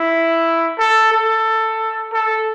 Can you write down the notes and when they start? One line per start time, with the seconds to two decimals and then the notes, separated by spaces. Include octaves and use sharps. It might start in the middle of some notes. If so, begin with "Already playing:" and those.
Already playing: E4
0.78 A4
1.12 A4
2.13 A4